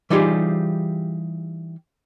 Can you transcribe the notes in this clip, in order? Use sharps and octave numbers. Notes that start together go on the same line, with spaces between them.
E3 G3 D#4 F4 G4 G#4